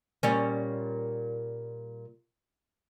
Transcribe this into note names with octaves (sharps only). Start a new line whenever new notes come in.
A#2 G3 C#4